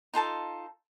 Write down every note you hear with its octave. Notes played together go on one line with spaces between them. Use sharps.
D#4 F4 A4 A5